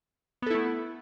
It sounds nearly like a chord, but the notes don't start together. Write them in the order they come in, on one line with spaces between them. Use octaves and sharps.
B3 A4 E4 A3